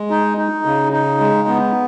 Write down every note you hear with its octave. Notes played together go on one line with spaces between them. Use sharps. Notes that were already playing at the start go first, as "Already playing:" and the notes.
Already playing: G#3
D#4
D#4
C#3
D#4
G#3
B3